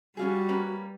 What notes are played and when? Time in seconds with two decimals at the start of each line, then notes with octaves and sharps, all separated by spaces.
0.17 G3 C#4 F4 F#4 G#4
0.49 A#3 C#4 B4